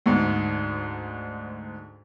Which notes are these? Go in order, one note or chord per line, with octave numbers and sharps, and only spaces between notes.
D2 G#2